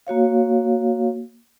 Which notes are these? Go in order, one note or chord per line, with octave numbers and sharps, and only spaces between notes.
A#3 F#4 C#5 F5